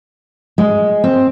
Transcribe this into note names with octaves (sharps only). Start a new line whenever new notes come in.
G#3
C4